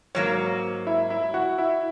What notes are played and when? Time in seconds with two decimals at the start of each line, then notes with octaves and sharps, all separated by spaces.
0.15 G#2 F#3 A#3 C#5
0.87 E4 E5
1.10 E4 E5
1.34 F#4 F#5
1.58 E4 E5